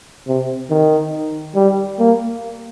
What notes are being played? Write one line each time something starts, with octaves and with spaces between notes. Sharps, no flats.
C3
D#3
G3
A#3